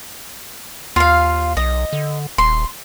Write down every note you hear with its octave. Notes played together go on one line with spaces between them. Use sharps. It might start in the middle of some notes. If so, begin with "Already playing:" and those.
D#2 F4 F5
B1 D#5
D3
D#1 C6